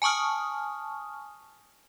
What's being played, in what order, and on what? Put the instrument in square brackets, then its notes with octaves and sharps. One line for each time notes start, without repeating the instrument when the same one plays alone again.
[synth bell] G#5 A5 C#6 D#6 F6